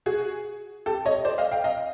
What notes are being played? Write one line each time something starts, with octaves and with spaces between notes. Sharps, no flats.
F#4 G#4
G4 A4
C#5 D#5
C5 D5
D#5 F5
F5 G5
D#5 F5